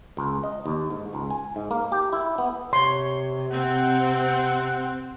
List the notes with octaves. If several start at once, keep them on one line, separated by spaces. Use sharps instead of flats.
C#2
D#5
D#2
G#2
C#2
G#5
G#2
A#3
G4
E4
B3
C3 C#5 C6
C4 F#5